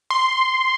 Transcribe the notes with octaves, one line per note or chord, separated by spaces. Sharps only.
C6